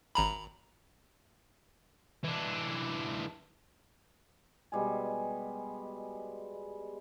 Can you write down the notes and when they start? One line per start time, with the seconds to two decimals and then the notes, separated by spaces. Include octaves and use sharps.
0.15 G#1 A#5 B5
2.24 E3 D4
4.72 B2 G3 G#3 G#5